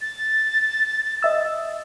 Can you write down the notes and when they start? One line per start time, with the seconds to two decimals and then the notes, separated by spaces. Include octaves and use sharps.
0.01 A6
1.23 D#5 E5 E6